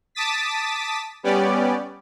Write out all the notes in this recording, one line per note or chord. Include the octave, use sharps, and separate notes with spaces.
A5 D6 D#6 A6 B6
G3 B3 C#4 G4 D5